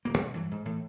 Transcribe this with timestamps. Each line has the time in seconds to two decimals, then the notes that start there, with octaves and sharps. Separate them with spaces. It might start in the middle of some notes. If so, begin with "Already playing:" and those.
0.05 D#1 A#3
0.18 B1 C#3
0.34 G2 E3 F#3
0.51 G#2
0.65 A2 E3